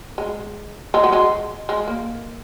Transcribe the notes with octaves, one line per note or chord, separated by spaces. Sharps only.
G#3
G#3
F#3
G#3
G#3
A#3